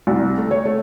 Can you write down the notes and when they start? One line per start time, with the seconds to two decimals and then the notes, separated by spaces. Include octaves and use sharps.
0.07 C2
0.38 A3
0.51 C#5
0.65 A3